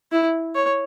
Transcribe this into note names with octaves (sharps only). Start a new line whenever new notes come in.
E4
C#5